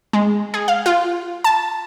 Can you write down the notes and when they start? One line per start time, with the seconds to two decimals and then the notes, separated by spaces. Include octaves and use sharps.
0.13 G#3
0.54 G#4
0.68 F5
0.86 F4
1.44 A5